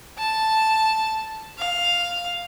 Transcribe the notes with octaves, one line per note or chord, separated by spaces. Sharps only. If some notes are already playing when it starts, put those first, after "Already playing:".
A5
F5